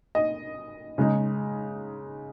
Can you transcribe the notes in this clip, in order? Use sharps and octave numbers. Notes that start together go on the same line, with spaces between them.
D#5
C#3 G#3 D#4